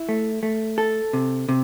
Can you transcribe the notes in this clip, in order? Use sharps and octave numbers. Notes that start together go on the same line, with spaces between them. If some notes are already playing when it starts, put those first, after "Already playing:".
Already playing: E4
A3
A3
A4
C3
C3